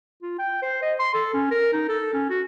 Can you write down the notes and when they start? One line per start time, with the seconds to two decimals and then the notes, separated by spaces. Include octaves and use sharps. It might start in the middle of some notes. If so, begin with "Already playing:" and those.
0.23 F4
0.39 G5
0.62 C5
0.82 D#5
1.00 C6
1.14 A4
1.34 C#4
1.51 A#4
1.73 D#4
1.89 A4
2.13 C#4
2.30 F#4